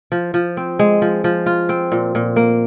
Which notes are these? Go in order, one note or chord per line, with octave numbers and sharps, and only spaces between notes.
F3
F3
C4
G#3
F3
F3
F4
C4
A#2
A#2
A#3